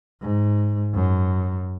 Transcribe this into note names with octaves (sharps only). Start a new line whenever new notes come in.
G#2
F#2